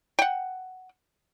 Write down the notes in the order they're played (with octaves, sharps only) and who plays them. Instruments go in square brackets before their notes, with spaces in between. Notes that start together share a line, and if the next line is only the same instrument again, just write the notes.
[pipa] F#5 G5